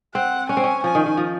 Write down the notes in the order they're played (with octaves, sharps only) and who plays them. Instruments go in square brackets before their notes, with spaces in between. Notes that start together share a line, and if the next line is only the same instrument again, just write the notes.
[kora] C4 [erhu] F#5
[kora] C#4 [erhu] G#5
[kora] C4
C#4
[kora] F3 [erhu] G#5
[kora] D#3
D#3
F3